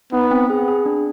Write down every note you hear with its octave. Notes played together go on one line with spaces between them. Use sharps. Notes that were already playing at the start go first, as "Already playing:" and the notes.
B3 D#4
C4
G#4
G#4
D4